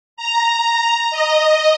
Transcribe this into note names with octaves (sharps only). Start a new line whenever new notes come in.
A#5
D#5